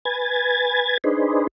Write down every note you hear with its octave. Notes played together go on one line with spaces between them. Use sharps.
B4 G#5 G#6 A6
D4 D#4 G#4 B4 C5